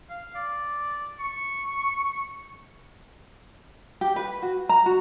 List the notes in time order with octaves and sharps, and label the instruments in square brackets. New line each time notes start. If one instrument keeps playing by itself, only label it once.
[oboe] F5
D5
C#6
[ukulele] G4
B4
F#4
A#5
F#4